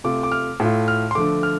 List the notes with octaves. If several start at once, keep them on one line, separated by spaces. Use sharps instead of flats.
C3 A3 F4 D6
D6
F6
A2 A3 F4
F6
C6
D3 F3 A3 D6
F6